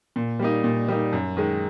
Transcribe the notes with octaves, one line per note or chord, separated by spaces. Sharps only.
A#2
G3 A#3 D#4
A#2
G3 A#3 D#4
F#2
D#3 G#3